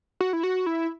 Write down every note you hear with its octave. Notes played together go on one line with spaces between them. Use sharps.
F#4
E4
F#4
E4